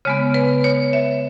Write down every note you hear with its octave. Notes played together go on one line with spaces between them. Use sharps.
C#3 G#3 B3 C#5
B4
C#5
E5